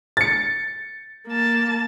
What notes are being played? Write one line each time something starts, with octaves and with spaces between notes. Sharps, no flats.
A6 C#7
A#3 A5